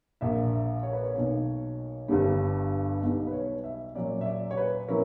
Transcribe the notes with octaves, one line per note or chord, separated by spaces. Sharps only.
A#1 A#2 A#3 D4 E5
E5
C#5
B4
C#5
B1 B2 A#3
G1 G2 D3 G3
B1 B2 G3 B3
B4
C#5
E5
A#2 F#3 C#4 D5
E5
D5
C#5
B4
A#2 F#3 C#4 E4 A#4